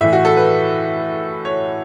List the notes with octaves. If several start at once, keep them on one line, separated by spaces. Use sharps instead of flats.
A2 E3 E5
F#4
A4
B4
C#5